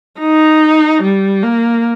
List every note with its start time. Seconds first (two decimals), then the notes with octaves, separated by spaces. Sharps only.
0.20 D#4
1.02 G3
1.43 A#3